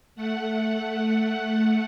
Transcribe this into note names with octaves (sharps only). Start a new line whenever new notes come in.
A3 F#5